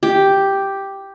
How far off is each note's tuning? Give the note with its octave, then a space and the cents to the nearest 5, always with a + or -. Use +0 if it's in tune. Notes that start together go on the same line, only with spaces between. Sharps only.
G4 +0